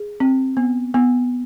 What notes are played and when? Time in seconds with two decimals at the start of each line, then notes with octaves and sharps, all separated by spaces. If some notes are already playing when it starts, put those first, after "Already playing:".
Already playing: G#4
0.20 C4
0.57 B3
0.94 B3